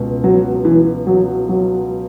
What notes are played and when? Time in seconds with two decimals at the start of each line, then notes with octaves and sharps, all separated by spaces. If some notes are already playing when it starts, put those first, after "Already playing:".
Already playing: C#2 B2
0.24 F#3
0.65 E3
1.07 F#3
1.49 F#3